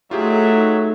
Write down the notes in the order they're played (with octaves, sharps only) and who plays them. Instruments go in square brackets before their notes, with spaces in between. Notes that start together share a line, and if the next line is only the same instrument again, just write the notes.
[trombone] F#3 [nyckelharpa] A3 E5 [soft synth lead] D#4 [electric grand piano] F4 G4 G#4